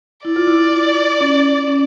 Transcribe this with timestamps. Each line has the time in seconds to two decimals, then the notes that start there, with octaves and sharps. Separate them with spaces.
0.25 E4 D5
0.36 F4
0.47 E4
0.73 F4
1.21 C#4
1.68 C#4